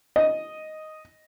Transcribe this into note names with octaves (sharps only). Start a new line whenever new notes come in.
D#5